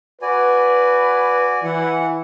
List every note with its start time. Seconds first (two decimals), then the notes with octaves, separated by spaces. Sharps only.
0.22 F#4 B4 D5 G#5
1.64 E3 F#5